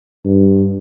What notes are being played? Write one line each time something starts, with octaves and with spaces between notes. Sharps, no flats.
G2